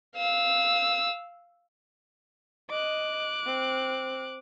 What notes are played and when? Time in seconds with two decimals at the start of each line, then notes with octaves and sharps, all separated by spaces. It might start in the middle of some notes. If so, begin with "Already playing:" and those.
0.16 F5 E6
2.70 D#5 D6 F#6
3.45 C4